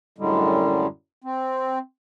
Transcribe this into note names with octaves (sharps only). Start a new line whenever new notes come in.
F#2 A2 D3 G3 G#3
C4